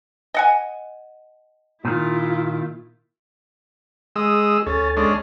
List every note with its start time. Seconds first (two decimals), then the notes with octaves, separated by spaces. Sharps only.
0.34 D#5 F#5 G#5
1.85 A#2 D#3 E4 F4
4.16 G#3 G#4 D#6 E6
4.66 D2 C#4 A4 A6
4.97 G#3 C#4 D4